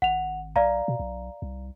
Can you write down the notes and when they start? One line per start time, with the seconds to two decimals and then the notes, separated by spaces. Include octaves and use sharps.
0.02 G#1 F#5 F7
0.56 B1 D5 F5 A#5
0.88 B2
0.99 B1
1.42 C2